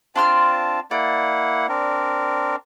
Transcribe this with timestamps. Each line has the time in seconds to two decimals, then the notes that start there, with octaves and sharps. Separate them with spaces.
0.16 C4 D4 F4 A5 C6 F6
0.91 A#3 E4 D5 F#5
1.69 C4 D4 A#4